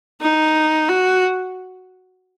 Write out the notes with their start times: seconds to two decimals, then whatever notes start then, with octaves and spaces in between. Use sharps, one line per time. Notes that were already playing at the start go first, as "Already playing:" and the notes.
0.21 D#4
0.89 F#4